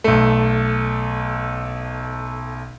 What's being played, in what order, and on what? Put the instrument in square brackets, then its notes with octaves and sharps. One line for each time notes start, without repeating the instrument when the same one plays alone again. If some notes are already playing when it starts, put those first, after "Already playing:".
[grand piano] B1 A3